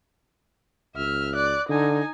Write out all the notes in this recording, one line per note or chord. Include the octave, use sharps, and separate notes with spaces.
C#2 E5 F6
D5 F#6
D3 D#4 G#5